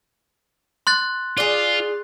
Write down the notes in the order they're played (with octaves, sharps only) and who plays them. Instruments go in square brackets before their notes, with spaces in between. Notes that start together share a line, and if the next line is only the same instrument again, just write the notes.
[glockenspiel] C6 F#6 A6
[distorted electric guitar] F4 [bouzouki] G#4 D5